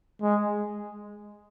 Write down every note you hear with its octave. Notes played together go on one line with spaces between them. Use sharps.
G#3